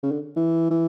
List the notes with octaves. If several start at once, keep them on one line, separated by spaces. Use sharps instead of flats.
C#3
D3
E3
E3